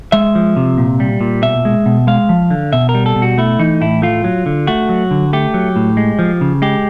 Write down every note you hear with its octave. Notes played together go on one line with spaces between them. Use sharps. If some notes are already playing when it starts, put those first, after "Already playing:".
G#3 E5
F3
C3
A#2
G3
A#2
B2 E5
G#3
B2
G#3 F5
F3
D3
B2 E5
A#4
G3
A4
B2
F#4
A3 E4
E3 D#4
A2 E4
A3 F4
F#3
D3
A3 F#4
F#3
D3
A3 G4
F#3
A2
G#3
F3
C#3
G#3 G4